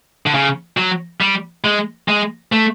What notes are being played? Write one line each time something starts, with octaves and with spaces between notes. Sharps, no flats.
D3
C#3
F#3
G3
G#3
G#3
A3